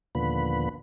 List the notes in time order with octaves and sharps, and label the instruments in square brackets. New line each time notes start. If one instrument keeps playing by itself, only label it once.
[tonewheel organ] D#2 A#2 D3 F3 B3 B5